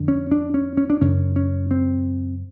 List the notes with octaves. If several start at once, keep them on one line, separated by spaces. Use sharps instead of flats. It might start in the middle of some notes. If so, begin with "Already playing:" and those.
Already playing: F2 D3
C#4
D4
C#4
C#4
D4
F#2 C#3 C#4
C#4
C4